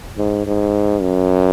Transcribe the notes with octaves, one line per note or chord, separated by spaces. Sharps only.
G#2
G#2
F#2